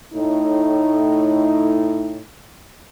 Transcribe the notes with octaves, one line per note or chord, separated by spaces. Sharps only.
A2 D#4